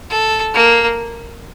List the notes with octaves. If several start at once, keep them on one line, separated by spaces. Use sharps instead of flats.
A4
A#3